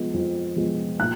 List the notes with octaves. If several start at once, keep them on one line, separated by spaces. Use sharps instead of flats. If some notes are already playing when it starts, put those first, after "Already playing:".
Already playing: F3 G#3 B3 F4
F2
F3 G#3 B3 F4
A#2 F#6